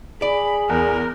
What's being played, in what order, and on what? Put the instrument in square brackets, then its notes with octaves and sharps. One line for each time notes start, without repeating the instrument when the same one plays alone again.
[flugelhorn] G#4 [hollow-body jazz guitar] D5 [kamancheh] B5
[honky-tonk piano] E2 [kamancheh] A#4